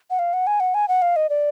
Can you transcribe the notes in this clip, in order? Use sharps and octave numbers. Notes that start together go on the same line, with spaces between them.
F#5
F5
F#5
G#5
F#5
G#5
F#5
F5
D#5
D5